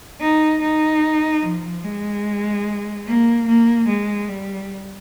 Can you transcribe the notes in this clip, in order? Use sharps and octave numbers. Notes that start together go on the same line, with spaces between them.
D#4
D#4
F3
G#3
A#3
A#3
G#3
G3